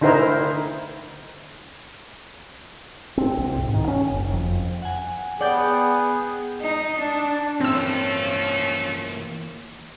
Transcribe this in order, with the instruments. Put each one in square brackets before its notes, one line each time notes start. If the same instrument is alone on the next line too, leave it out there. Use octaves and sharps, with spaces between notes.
[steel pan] D3 D#4 E4 A#4 C5
[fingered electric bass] C4
C2
G#2
D#3
C#4
F#1
F2
[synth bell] F#5 G#5
[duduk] B3 [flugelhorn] G#4 [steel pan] D5 [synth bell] F#5 G5 G6
[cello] D#4
D4
[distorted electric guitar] E3 A#3 [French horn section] F3 A3 C#4 [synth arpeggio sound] C4 E6